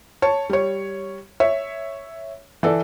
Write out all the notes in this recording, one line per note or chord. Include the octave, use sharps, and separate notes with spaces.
C#5 A5
G3 C#5
C#5 E5
E3 A4 D5